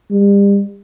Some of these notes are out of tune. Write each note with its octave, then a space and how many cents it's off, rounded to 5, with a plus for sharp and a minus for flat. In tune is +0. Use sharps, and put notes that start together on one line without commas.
G3 +35